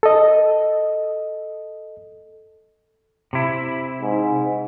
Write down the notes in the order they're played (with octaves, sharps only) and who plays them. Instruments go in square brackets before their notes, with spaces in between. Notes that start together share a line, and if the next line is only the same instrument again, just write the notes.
[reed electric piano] A4 D#5
[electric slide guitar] C3 E4
[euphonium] G#2